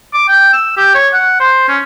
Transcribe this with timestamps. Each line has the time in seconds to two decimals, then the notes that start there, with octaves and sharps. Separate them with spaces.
0.14 D6
0.28 G5
0.53 E6
0.77 G4
0.95 C#5
1.13 F#5
1.40 C5
1.68 C#4